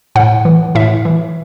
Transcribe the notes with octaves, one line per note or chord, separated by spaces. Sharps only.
A2 F#5
E3
A2 E5
E3